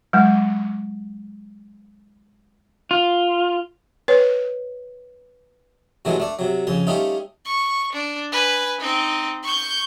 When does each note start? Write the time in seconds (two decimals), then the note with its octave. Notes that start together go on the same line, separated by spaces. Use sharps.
0.13 F#3 G#3
2.91 F4
4.08 B4 C#5
6.05 A2 C3 E3 F#3 G#3 A3
6.20 A3 D4
6.39 C3 F#3
6.67 F2 C#3 C6
6.87 G3 A3 C#4 D#4 F4
7.45 C#6
7.93 D4
8.32 B4 G#5
8.80 C4 D#4
9.43 C#6 G6